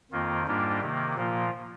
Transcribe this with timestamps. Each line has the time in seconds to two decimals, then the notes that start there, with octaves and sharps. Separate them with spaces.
0.12 F2 D#3 A#3 F4
0.46 G#2 G3 A#3 D4 F4
0.81 C3 D#3 A#3
1.15 A#2 F3 A#3 F4